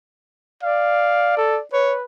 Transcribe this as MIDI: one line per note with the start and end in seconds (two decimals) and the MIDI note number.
0.63 1.61 74
0.63 1.34 77
1.37 1.59 69
1.72 2.04 71
1.72 1.94 73